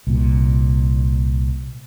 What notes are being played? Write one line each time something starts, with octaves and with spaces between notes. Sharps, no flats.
C2 A#2